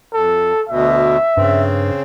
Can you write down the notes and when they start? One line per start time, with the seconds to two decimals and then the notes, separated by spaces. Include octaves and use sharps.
0.14 F2 A4
0.69 D2 B2 E5
1.37 G2 C#3 C4